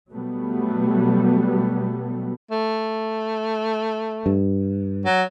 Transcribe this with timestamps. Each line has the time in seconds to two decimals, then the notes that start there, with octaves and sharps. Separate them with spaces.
0.10 B2 F#3 G3 A3 B3
2.51 A3
4.26 G2
5.06 F#3